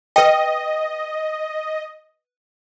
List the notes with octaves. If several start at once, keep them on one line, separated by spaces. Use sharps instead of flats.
B4 D#5 G5